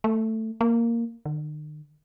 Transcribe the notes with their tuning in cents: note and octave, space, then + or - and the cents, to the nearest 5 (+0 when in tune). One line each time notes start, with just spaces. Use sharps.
A3 +10
A#3 -5
D#3 -45